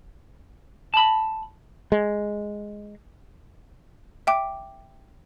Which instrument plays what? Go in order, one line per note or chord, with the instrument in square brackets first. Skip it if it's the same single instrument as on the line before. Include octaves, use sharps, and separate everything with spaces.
[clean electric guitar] A5 B5
[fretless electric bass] G#3
[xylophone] E5 G5 D6